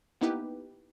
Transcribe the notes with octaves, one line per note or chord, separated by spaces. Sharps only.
A#3 B3 D#4 E4 G4 B4